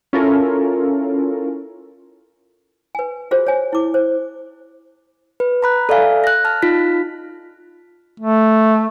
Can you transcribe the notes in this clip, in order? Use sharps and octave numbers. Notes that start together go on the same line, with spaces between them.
C#4 E4 F4 A4 A#4
B4 G#5
F4 F#4 G#4 C5
C#5 G#5
E4 D6
C5
B4
A#5 B5 F#6
A4 D5 E5 F5 G#5
F#6 A#6
A5 F6
D#4 F4 B6
A3